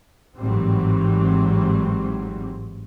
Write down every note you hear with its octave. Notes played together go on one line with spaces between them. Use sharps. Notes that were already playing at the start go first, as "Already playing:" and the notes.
G#1 A2 E3 F#3 G3 C4